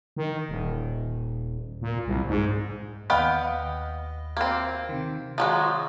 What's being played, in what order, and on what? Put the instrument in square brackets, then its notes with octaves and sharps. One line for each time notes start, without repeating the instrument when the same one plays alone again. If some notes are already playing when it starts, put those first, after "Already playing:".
[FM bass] D#3
D#1
A#2
C2
G#2
[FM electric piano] D#2 D#5 [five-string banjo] B3 F5 G5
[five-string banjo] A#3 C4
[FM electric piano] C3 D#3
[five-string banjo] F3 F#3 G#3 [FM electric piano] A#5